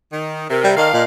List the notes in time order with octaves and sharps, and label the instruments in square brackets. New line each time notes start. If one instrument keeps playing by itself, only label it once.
[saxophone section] D#3
[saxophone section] C3 [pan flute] A#4
[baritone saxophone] G3
[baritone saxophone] D#3 [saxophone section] A4 D5 F5 [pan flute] D#5
[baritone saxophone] A#2 [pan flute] D#5